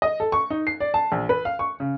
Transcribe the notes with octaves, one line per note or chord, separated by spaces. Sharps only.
D#5
A4
C#6
D#4
C7
D5
A5
A#1
B4
F5
C#6
C#3